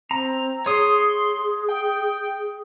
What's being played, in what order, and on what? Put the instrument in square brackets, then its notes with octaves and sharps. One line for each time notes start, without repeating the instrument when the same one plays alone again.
[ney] C4 [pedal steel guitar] A#5
[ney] G#4 [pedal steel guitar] C#5 D#6 [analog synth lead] C6
[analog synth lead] G5